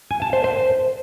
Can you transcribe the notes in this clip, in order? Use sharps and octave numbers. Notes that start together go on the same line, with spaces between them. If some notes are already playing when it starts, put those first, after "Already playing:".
G#5
A5
C5
C5